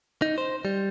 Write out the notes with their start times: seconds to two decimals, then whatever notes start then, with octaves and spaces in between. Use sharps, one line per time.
0.22 D#4
0.38 C5
0.65 G3